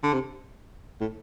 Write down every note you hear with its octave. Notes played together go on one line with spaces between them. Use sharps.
D3
C3
A2